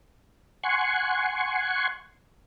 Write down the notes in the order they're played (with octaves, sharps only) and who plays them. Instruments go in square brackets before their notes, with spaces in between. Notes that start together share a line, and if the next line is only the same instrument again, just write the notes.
[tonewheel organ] F#5 G#5 C6 C#6